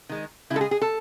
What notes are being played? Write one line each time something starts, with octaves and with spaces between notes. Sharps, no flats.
D#3 G#3
C#3 G#3 E4 A4
G#4
G#4
A4